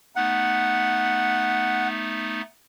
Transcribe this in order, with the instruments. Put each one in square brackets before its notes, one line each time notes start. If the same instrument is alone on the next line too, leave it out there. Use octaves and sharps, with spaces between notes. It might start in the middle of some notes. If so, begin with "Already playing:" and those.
[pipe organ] A3 B3 D#4 [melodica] F#5